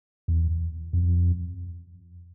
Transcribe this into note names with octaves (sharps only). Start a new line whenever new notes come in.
E2
F2